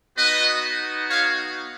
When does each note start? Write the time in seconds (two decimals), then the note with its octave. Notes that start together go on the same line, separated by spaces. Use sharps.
0.17 B3 D#4 F#4 B4 D#5
1.09 C#5 F5